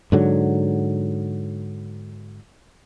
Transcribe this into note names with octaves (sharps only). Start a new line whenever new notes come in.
G#2 D3 F#3